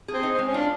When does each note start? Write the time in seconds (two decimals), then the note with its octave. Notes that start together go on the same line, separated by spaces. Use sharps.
0.08 G#4
0.13 C4
0.23 D#4
0.34 G#3 C4
0.48 C#4
0.54 D4 F4